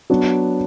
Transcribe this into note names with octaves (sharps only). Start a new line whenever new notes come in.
F#3 B3 D4